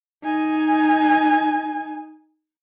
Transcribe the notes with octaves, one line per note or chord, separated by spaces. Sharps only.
D#4 G#5